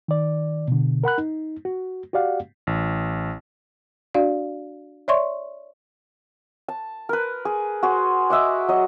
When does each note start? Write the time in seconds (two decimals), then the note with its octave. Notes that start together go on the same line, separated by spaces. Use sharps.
0.08 D#3 D5
0.68 B2 D3
1.04 A#4 F#5 B5 F#6
1.18 D#4
1.65 F#4
2.13 F#4 G4 D5 F5 F#5
2.67 A1
4.14 D4 F#4 D5 F5
5.08 C#5 D5 E5 C6 C#6
6.68 A5
7.09 A#4 B4
7.45 G#4
7.83 F#4 G#4 C5
8.30 D#5 E5 F#5 D6
8.68 F#3 D#5